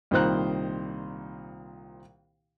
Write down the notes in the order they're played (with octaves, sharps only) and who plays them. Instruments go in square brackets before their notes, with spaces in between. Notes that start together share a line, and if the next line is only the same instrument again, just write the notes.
[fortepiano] C2 A#2 D#3 C5 A#5 F#6